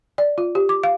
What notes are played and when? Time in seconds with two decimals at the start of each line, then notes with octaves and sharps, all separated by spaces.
0.18 D5
0.38 F4
0.55 G4
0.69 D6
0.84 F5